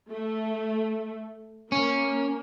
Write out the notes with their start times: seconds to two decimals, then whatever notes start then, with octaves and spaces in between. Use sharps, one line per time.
0.10 A3
1.72 A#3 C#4